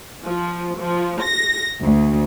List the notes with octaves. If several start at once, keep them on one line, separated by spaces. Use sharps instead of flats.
F3
F3
A#6
D2